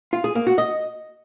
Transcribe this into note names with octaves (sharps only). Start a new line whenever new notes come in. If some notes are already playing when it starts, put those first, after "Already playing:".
F4
G#4
A#3
F#4
D#5